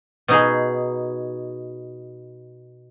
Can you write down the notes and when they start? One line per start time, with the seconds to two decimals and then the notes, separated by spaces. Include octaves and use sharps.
0.28 B2 D#4 G#4